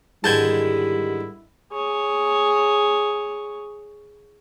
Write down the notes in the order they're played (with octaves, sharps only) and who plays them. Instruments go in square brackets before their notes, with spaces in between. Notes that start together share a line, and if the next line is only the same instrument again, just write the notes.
[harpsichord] G#2 D3 D#3 [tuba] G3 [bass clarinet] E4 [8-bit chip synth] A5 G6 G#6
[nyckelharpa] G#4 C#5